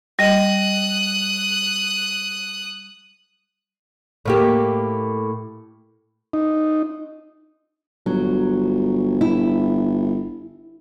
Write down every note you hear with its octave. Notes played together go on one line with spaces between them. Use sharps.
G3 D#5 D#6 F#6
A2 A#3 G4
D#4
G1 F#3
E4